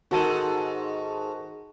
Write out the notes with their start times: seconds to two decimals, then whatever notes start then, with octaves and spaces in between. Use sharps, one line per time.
0.11 G#2 D#3 F#4 A4 A5 D#7